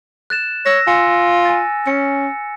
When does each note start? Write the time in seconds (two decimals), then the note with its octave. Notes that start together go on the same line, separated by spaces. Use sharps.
0.30 F#6 A6 E7
0.66 C#5 E6 A#6
0.87 F4 G#5 E6 C#7
1.45 G#5 A6
1.87 C#4 C#7